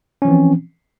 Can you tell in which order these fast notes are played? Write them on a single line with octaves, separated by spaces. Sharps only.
C#4 F3 E3 C4